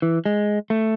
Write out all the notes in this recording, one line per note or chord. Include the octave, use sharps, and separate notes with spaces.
E3
G#3
A3